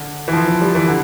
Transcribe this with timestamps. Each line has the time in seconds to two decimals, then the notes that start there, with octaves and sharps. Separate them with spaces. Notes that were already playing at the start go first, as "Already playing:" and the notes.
Already playing: D3
0.28 E3
0.33 F3
0.47 F3
0.61 G3
0.75 E3
0.88 D3